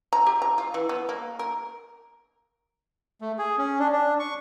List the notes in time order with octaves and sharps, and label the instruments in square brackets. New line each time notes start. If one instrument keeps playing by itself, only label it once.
[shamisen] A#5
G4
A#5
F4
E3
B3
A#3
A#4
[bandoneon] A3
G#4
C#4
D4
D4
C#6